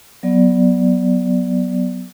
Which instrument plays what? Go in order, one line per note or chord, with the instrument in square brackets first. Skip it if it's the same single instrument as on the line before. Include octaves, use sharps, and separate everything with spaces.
[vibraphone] F#3 B3 D5